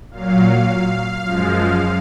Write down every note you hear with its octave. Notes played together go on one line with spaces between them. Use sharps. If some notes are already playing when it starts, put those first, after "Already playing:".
A#2 F#3 F5
F#2 F3 G#3